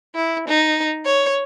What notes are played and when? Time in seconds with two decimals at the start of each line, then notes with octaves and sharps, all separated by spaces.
0.15 E4
0.48 D#4
1.06 C#5